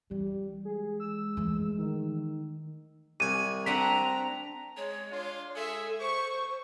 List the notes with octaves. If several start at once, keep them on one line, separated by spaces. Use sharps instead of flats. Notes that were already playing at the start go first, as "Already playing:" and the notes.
E3 G3
G#3 G#4
E6
E3 A3
D#3
C2 G#5 D#7
C4 D4 F#5 A#5 B6
G#3 C#5
D4 F4 C6
G#3 G#4 A4 E5
C5 C#6